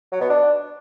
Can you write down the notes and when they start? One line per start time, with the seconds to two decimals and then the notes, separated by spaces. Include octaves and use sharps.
0.12 F#3
0.21 B2
0.30 D4